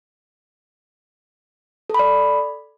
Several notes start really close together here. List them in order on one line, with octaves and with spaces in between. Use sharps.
A4 B5 D5